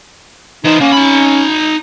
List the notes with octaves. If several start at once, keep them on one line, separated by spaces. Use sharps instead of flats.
E3 D#4 C5
A#3 C#4
D#4 B5